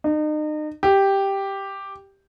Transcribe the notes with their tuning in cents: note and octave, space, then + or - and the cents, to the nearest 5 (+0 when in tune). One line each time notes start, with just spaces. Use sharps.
D#4 -35
G4 +0